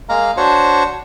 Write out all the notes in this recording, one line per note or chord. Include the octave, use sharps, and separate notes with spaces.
G#3 A#3 F5 A#5
D4 F#4 C5 C#5 C#6